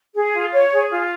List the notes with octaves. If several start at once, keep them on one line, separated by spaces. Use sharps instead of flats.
G#4
F4
C#5
G#4
F4